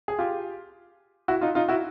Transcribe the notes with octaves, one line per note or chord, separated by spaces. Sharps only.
G#4
F4 G4
E4 F#4
D#4 F4
D#4 F4
E4 F#4